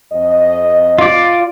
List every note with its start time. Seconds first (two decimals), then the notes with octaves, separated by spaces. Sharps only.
0.13 F2 D#5
0.98 F4 D5